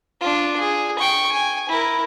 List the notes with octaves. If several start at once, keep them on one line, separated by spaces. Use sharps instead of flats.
D4 F4
G#4
G5 C#6
G#5
E4 A#4